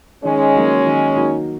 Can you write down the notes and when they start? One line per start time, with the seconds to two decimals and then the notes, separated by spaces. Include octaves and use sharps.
0.24 D#3 G#3 C#4
0.55 F#3 A#3 D#4 F#4
0.86 D#3
1.16 F#3 A#3 D#4 F#4